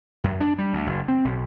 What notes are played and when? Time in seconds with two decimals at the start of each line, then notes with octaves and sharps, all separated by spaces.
0.24 F#2
0.41 D4
0.58 G3
0.73 D2
0.87 F#1
1.08 C4
1.25 B1